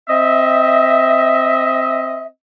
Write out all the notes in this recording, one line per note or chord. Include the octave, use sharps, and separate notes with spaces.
C4 D#5 E5